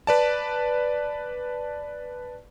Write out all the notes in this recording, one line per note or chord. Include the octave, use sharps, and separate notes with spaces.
B4 D5 A5